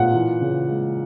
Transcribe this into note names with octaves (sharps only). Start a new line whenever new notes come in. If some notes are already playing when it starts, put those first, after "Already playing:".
Already playing: A#2 F#5
E3
C#3
G#3